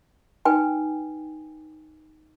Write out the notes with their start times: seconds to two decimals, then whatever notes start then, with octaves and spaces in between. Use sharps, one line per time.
0.45 D#4 B4 G5 G#5